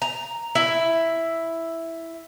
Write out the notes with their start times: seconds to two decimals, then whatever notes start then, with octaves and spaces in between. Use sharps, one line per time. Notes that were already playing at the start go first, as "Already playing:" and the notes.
0.02 A#5
0.55 E4